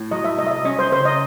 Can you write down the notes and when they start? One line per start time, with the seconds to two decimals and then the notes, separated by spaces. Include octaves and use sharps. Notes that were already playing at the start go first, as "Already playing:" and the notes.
Already playing: A2
0.11 F#3 D#5
0.25 E5
0.38 C2 D#5
0.47 E5
0.51 D#5
0.65 C#4 D#5
0.79 C5
0.91 C#3 C5
1.05 D#5